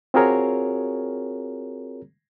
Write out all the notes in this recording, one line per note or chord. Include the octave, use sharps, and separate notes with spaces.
C4 F4 F#4 G#4 A#4 C#5